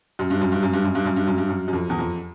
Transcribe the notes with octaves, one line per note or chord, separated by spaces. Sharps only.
F#2
G2
F#2
G2
F#2
G2
F#2
G2
F#2
G2
F#2
G2
F#2
F#2
F2
E2
F2